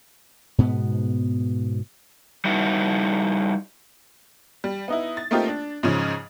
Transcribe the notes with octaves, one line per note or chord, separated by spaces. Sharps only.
G#2 B2 B3
G3 D#4 E4 F#4
G3
B3 D#4 E4
A6
A3 A#3 C4 D#4 F4 G4
D4
G#2 C#3 F3 C#4